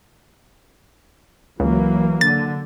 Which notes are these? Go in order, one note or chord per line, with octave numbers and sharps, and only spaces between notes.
C#2 E3 F#3 A#3
D3 A6